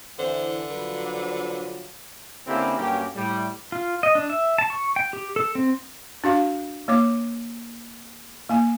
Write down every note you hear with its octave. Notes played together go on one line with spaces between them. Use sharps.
D3 E3 C5
F3 F#3 F4 B4
D3 A#3 C4 C#4 E4 G4
G2 F#3 A#3 C#4 G4
A2 G3
F4
D#5
D4
E5
A5
C#6
G5
G4
A4
C4
D4 F#4 F5
A#3 C#5 D6
A#3 G#5